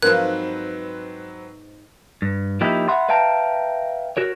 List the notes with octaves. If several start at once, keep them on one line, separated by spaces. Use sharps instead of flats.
G#2 F3 F#3 C4 A#4 B4 F#6
G2
F3 A#3 D#4 E4 G4
E5 F#5 B5 C6
B4 E5 F5 G5 A5 A#5
F#4 A#4 C#5